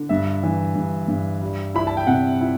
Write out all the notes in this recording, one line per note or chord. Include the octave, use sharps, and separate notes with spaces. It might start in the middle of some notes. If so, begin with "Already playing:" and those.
Already playing: D3
G2 E5
E3
G2
G2
G3
E4 B5
A5
G5
C3 F#5
E4